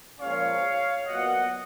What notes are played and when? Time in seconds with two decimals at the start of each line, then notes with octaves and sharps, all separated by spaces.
0.19 A#2 F3 G#3 C#4 C#5 F5
1.05 A#2 F#3 B3 D#5 F#5